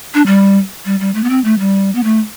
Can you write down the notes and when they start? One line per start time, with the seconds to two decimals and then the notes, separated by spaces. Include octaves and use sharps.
0.14 D4
0.26 G3
0.85 G3
1.00 G3
1.15 A3
1.24 B3
1.30 C4
1.44 A3
1.59 G3
1.95 B3
2.04 A3